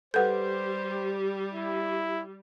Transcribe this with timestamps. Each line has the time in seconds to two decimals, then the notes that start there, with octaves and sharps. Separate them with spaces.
0.14 G3 G4 A4 B4 C5 F#5 G6
1.54 E4